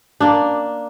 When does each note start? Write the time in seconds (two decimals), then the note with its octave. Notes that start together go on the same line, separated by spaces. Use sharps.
0.20 A#3 D4